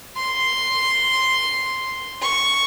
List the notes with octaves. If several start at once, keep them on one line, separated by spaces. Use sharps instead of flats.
C6
C#6